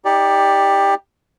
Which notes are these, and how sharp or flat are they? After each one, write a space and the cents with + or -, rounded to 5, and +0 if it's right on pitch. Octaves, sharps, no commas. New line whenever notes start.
D#4 +30 G4 +15 D5 +0